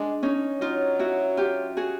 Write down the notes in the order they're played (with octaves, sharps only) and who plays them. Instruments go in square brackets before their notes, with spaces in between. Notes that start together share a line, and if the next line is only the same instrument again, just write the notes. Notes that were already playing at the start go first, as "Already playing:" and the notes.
Already playing: [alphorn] G#3 [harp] D4
[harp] C#4 D#4
[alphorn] F#3 [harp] D#4 F4
[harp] E4 F#4
F4 G4
F#4 G#4